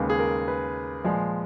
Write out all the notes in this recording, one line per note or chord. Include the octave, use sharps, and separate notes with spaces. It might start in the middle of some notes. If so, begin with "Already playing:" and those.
Already playing: D#2 C#3 G#3 B4
G#4
A#4
B4
A#2 F3 G#3